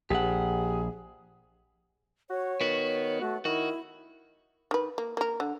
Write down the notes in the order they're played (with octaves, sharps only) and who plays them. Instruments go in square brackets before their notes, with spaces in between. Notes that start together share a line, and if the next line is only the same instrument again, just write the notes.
[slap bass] A#1 [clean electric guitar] G4 F#5 [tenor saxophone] G#4
[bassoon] F#4 [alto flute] C#5
[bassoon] D#3 [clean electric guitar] B3 F#4
[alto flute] A3 [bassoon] F#4
[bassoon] D#3 [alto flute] E4 [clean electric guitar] F#4
[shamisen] D#3 B4
A#3
A#3 A#4
D3